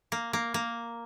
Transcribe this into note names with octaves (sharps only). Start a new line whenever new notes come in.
A#3
A#3
A#3